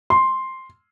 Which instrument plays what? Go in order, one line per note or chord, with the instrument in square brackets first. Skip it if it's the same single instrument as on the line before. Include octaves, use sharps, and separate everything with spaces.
[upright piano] C6